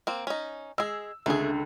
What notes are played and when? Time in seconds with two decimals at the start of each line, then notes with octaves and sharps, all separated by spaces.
0.07 A#3 C4
0.27 C#4 D#4
0.78 G#3 G#4 E6
1.26 C#2 D3 A3 G#4